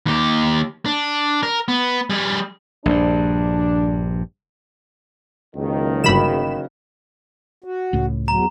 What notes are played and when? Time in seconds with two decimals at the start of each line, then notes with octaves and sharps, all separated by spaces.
0.06 D#2 G4
0.86 D4
1.43 A#4
1.68 B3
2.10 G3 G#4
2.86 A#1 G2 D4
5.56 F#1 C#2 D#3
6.04 G1 C#3 F#3 B5 E7
7.64 F#4
7.93 C#2 A2
8.28 E2 F#3 A#5